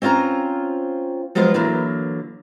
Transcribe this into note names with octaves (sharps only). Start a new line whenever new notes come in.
C4 C#4 F4 C5 A#5
F3 F#3 G#3 B3 F4 C5
D3 E3 F#3 A#3